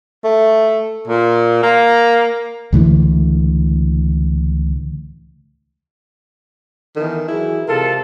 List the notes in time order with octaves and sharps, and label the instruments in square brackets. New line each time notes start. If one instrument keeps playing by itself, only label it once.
[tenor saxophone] A3
A#2
A#3
[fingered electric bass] C#2 A2 D3 E3
[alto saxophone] D#3 [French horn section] E3 B3 A4
[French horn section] E3 F#3 G#4 [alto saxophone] E4
[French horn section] C3 [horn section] G#3 F4 A4 [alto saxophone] A#4